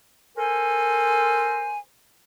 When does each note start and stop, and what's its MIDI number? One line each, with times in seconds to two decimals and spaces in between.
0.37 1.77 69
0.37 1.77 70
0.37 1.77 72
0.37 1.77 80